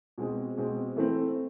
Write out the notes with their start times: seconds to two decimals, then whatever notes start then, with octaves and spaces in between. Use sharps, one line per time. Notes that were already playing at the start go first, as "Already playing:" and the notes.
0.18 B2 G#3 C4 G#4
0.57 B2 G#3 C4 G#4
0.96 E3 A3 C4